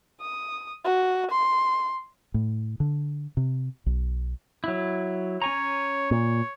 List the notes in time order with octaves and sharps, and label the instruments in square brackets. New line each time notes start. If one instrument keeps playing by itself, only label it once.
[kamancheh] D#6
F#4
C6
[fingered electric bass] A2
D3
C3
B1
[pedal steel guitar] F#3 E4
[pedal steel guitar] C#4 G#5 A#5 [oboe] C#5
[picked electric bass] A#2 [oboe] C#5